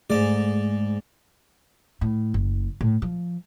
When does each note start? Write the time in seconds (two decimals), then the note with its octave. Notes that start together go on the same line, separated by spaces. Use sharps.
0.10 G#2 A3 G#4 D5
2.01 A2
2.34 F#1
2.81 A2
3.02 F3